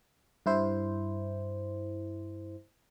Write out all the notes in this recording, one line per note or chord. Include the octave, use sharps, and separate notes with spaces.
G2 E4 C5